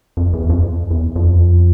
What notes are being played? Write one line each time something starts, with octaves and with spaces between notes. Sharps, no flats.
F2
E2
F2
E2
F2